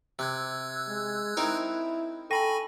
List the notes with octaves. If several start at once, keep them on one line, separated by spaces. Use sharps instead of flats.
C3 E6 F#6 G#6
G#3
C4 D#4 E4 A#4
A4 G5 G#5 B5 C#6 A#6 D#7